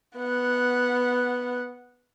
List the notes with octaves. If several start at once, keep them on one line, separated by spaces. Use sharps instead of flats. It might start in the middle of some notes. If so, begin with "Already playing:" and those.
B3 F#5